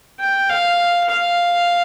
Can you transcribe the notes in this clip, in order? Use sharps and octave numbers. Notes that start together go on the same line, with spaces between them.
G5
F5
F5